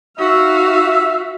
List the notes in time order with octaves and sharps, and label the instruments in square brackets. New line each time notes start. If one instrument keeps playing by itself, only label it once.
[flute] D#4 [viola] F#4 F5 [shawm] E5